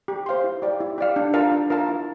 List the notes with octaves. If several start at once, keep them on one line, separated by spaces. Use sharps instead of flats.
G4
C5 F5 C6
E4
G4 D5 F5
E4
G4 D5 F5
D4
F4 A#4 F5 A5
D4
F4 A#4 F5 A5
E4